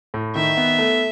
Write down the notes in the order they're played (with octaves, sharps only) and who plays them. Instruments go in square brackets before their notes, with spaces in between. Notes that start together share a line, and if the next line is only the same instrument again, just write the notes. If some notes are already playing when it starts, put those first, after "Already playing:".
[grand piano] A2
[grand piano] D#3 [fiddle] E5
[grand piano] B3
A3